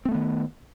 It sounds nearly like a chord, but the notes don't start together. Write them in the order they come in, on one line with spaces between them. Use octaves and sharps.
C4 A3 B3 D#3